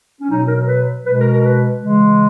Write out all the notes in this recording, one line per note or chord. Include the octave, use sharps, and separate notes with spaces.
C#4
B2 F#3 D#4
A#4
B4
B2 G#3 B4
A#4
A#4
B4
C#3 E3 G#3